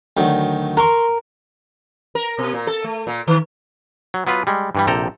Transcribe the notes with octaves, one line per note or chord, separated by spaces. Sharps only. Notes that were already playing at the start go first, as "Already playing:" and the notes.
D2 D#3 F#3
A#4 A#5 C6 C#6
A#4
B2
A#2
A4
A3
A#2
D#3
F#3
F#3 B3 F4 B4
G3 G#3
G2 E3 G3
A#1 C3 A4 G5 A#5